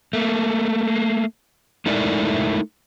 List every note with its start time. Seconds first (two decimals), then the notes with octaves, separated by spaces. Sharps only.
0.13 A3 A#3
1.86 G#3 A3 D#4 E4 A#4 D5